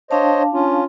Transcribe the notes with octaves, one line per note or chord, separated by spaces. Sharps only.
D4 C5 C#5 D#5 F5 A5
C#4 F4